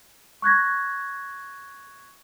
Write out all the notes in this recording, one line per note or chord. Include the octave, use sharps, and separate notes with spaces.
C#6 F#6 G#6 A#6